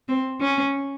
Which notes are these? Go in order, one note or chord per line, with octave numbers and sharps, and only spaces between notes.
C4
C#4